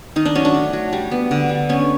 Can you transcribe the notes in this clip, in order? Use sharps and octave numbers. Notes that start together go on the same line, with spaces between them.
D#3 D#4
D4
F#3 C#4
D4
A3
F#3
G3
B3
D3
G3
B3 C#4